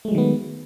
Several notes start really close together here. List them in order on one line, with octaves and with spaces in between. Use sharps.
A3 G#3 F#3 D#3 B3